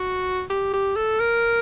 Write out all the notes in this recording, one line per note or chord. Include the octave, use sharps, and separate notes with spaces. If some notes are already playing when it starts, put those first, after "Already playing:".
Already playing: F#4
G4
G4
A4
A#4